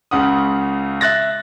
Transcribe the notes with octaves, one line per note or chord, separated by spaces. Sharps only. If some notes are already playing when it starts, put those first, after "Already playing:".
C#2 C#3 F#5 D#6
E5 F#6 A6 A#6